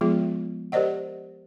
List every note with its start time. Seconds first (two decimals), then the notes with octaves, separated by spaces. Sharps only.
0.01 F3 G#3 B3 F4 G#4
0.72 G4 A#4 C5 D5 D#5 F#5